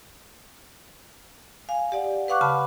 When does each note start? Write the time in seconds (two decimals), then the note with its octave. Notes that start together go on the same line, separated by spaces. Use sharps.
1.69 F5 G#5
1.92 G4 D5 F#5
2.28 B4 F5 F#5 C#6 D6 F#6
2.41 C#3 A5 B5